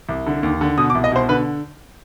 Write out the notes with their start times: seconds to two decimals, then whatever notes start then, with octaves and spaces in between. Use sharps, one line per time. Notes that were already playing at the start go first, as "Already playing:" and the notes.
0.09 C2
0.26 D3
0.43 D#2
0.61 D3
0.78 B2 D#6
0.90 D6
0.95 C2
1.04 D#5
1.12 B2 C5
1.29 D3 B4